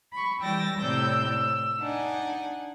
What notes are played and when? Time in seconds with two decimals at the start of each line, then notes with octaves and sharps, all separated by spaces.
0.12 B5 C#6
0.42 E3 G3 G5 E6 A6 A#6
0.79 A2 C3 D5 E6 G6
1.31 E6
1.80 D4 D#4 F#5 G#5